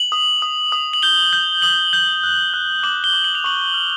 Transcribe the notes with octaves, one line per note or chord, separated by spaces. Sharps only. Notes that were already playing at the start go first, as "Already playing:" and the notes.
Already playing: F#7
D#6
D#6
D#6
F#7
G6 G7
G6
D#6 F#7
G6
F#6
F#6
D6 F#7
G7
D6
F#7
F7
C#6 F#7
F6